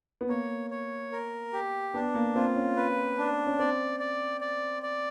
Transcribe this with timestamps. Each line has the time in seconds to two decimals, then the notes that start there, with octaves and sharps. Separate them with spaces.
0.21 B3
0.29 A#3 C#5
0.70 C#5
1.12 A#4
1.53 G4
1.94 B3 D4
2.15 A#3
2.35 C4 F4
2.56 C#4
2.76 B4
3.18 D4
3.47 C#4
3.59 C4 D5
4.00 D5
4.41 D5
4.83 D5